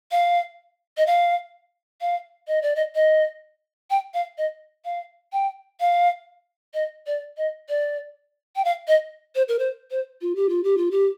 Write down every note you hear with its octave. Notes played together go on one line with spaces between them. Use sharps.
F5
D#5
F5
F5
D#5
D5
D#5
D#5
G5
F5
D#5
F5
G5
F5
D#5
D5
D#5
D5
G5
F5
D#5
C5
A#4
C5
C5
F4
G4
F4
G4
F4
G4